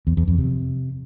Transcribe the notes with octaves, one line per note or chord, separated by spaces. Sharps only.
E2
E2
F2
C3